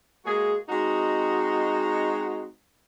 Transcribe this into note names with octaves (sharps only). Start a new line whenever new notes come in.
G#3 A#3 F#4 G#4
G#3 C4 D#4 F#4